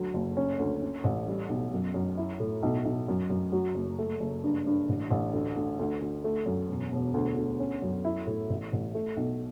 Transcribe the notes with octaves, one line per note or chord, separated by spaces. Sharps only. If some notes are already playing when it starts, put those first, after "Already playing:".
Already playing: D2 F#3
F#1
C#4
D2
C#4
A1
G3
B1
F#2
F#2
E4
A2
B1
B1
F#2
F#2
F#3
F#1
A3
F#1
G2
G2
A1
A1
D2
D2
D2
D2
A3
F#2
E1
E1
D2
D2
C#4
F#2
E4
A2
A1
A1
A3
B1